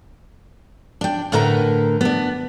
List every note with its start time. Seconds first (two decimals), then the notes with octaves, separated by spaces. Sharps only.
1.01 D4 G5
1.32 A2 D3 A#4 B4 A#5
2.01 B3 D4